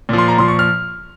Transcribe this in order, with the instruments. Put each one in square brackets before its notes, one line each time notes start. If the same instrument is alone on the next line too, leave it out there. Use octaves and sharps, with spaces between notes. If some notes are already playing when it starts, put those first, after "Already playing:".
[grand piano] A#2 F3
C6
A#5
A#2 F3 C6
C#6
F6